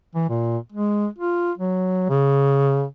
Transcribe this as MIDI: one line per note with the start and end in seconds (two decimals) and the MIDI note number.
0.15 0.26 52
0.30 0.58 46
0.73 1.07 56
1.19 1.52 65
1.58 2.08 54
2.10 2.85 49